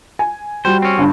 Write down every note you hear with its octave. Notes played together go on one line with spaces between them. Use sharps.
G#5
G3 F#4 C5
C4 C#4
G1 G2